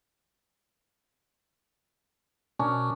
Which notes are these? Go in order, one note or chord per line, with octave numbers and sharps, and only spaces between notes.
B2 C#4 D4 A#4